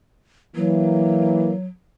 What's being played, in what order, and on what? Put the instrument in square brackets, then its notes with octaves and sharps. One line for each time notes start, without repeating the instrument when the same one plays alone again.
[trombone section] E3 A#3 [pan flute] F#3